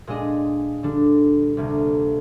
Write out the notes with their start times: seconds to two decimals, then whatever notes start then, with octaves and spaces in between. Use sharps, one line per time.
0.07 A#2 G#3 D4 G#4 D#5
0.83 D3 G3 D4
1.57 D2 C3 G3 A#3 D4